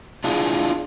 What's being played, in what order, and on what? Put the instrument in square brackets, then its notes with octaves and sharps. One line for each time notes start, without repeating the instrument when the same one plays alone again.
[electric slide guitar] D4 E4 F4 G#4